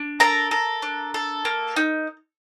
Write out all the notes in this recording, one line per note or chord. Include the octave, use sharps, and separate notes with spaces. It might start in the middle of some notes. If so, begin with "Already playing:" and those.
Already playing: D4
A4 A#4 A#5
A4
D4
A4
A#3
D#4